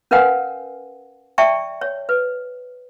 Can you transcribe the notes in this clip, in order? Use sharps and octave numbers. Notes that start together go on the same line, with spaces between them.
C#4 A#4 B4 F5 F#5 G#5
D5 E5 G5 A5 C#6
C#5
B4